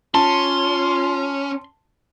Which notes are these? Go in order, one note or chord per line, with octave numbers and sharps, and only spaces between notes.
C#4 F4 A5 C6